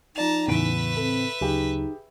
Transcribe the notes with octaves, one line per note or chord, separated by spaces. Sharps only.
F3 D#4 D5 A5 A#5 F7
E2 A2 C#3 E3 B4 E5 D7
C4 A4
D2 C#3 F#3 D#4 G4 G#4 G5